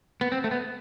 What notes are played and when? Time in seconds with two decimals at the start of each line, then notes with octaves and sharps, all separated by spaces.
0.21 B3
0.32 C4
0.44 A3
0.51 B3